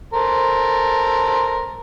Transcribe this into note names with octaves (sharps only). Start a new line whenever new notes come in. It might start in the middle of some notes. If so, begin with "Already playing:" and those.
A4 A#4 C5